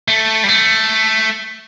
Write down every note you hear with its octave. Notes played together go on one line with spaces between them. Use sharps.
A3
G3
A3